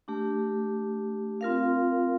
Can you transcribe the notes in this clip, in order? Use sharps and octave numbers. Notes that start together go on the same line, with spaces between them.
A3 D4 G4
C4 F4 A#4 F5